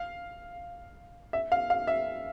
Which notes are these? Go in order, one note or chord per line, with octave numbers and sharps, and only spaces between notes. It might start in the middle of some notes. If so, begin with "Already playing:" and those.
Already playing: F5
E5
F5
F5
E5